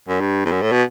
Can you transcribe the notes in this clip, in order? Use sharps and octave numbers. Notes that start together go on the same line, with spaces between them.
F#2
G2
E2
F#2
A2
B2